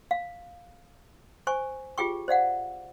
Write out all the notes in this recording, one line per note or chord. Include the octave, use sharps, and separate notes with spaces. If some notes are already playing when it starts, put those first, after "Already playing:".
F5
C5 G#5 C#6
F4 G4 G#4 G5 C#6
C5 D5 F5 F#5